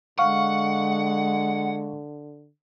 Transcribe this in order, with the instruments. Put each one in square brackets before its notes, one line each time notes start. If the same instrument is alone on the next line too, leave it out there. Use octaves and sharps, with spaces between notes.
[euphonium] D3 [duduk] G#3 [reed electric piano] F5 C#6 [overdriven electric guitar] F#5